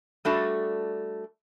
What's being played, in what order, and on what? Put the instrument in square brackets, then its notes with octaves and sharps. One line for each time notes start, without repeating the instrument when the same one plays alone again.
[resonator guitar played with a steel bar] G3 A3 D4 F#4 A4